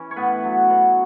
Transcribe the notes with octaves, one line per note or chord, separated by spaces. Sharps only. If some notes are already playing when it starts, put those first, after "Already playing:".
Already playing: E3 C#4
C#5
A2 B3 B4
F#3
B2